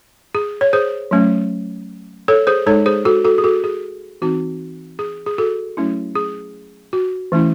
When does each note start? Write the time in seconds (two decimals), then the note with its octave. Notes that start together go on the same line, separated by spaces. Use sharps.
0.35 G#4
0.61 C#5
0.73 G#4 C5
1.11 F#3 A3 C#4
2.28 A4 C#5
2.47 G#4 C5
2.66 G#3 D#4 A4 C#5
2.86 G#4 C5
3.05 F#4 A4
3.25 F#4 A4
3.38 G#4
3.44 F#4 A4
3.64 G#4
4.22 E3 C4 D#4 F#4
4.99 G#4
5.26 G#4
5.38 F#4 A4
5.77 F#3 A3 C#4 E4
6.15 G#4
6.93 F#4
7.32 E3 A3 C#4 E4